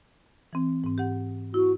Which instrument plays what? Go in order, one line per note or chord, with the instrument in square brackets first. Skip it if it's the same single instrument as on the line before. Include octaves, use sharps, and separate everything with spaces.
[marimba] E3 C4
G#2 C4
G4 F#5
[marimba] E4 [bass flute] F#4